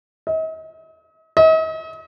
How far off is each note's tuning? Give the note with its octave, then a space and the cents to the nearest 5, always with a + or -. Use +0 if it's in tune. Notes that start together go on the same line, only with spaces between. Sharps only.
D#5 +45
D#5 +45